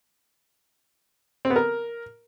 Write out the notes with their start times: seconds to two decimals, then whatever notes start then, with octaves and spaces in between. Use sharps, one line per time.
1.45 C4
1.50 B3
1.56 A#4